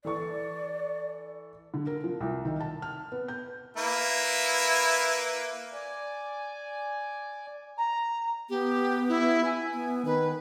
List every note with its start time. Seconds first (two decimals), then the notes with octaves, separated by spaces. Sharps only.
0.05 E3 A4 D5 C#6
1.74 D3
1.87 A#4
2.04 F3
2.20 C2
2.45 D#3
2.60 A5
2.82 F6
3.12 B3
3.28 G6
3.77 A#3 E4 B4
5.73 D5 G#5
7.78 A#5
8.50 B3 G4
9.09 E4
9.45 G#5
9.73 B3
10.05 D#3 B4